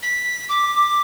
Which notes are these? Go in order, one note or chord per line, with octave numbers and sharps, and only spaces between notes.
B6
D6